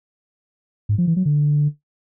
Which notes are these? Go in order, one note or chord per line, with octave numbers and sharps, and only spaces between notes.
G#2
F3
E3
F#3
D3